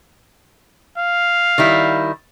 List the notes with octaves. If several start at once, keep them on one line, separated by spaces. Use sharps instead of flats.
F5
D#3 G3 E4